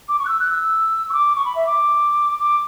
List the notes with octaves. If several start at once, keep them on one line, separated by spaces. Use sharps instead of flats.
D6
C#6
F#6
E6
F#6
E6
C#6
D6
C#6
B5
E5
D6
D6